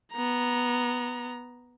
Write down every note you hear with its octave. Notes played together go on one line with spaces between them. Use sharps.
B3 A#5